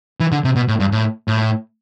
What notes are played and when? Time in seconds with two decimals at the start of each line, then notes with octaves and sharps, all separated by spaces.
0.20 E3
0.32 D3
0.44 C3
0.56 B2
0.68 A2
0.80 G2
0.92 A2
1.28 A2